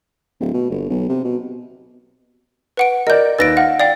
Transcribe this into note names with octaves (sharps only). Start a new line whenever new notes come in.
D1
B2
G1
B1
C3
B2
B4 F#5 D7
A#4 D5 D#5 G6
D#2 B4 E6 A6 A#6 D7
F5 F#5
D5 F5 G5 A6